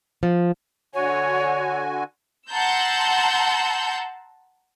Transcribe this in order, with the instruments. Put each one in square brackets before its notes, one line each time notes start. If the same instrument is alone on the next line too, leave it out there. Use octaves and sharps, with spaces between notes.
[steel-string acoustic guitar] F3
[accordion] D3 F#4 G#5 [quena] C#5
[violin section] F#5 A5 A#5 C6 E6 G6